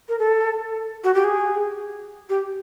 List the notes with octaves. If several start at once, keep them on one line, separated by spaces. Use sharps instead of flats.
A#4
A4
F#4
G4
G#4
G4